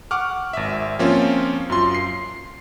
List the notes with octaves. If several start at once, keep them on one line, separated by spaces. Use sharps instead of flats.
F#5 C#6 D6 F6
G#1 E5
F3 A#3 C4 C#4 F4
F#2 F4 C6
C7